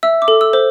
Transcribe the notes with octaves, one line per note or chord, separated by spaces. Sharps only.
E5 E6
D6
A4
E6
C5